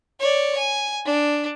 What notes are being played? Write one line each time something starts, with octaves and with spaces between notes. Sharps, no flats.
C#5 D5
G#5
D4